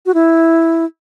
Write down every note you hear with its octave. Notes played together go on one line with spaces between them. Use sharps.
F#4
E4